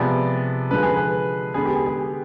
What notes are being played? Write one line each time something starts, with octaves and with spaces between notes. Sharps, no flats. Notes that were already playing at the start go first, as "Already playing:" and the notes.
Already playing: C3 F3 G#3 B3 D5
D3 F3 G#3 B4
G#4
B4
D3 G#3 B3 G#4
G4
G#4
G#4